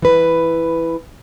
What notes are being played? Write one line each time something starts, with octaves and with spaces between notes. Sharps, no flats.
E3 B4